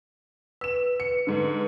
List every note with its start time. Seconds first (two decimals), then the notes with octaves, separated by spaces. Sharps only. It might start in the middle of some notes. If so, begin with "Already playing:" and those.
0.61 B4 E6 E7
1.00 C#7
1.27 G#2 D3